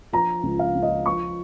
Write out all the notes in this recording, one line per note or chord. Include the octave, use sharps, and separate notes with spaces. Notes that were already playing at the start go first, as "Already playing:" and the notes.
F3 A#5
C#2
F5
C#2
D#5
F3 C#6